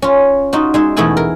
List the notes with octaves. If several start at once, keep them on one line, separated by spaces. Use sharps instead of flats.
C#4 F4
D#4 F4 F#4
G#3 D#4 E5
E2 B2 A3 E4 G#4 G#5
A#4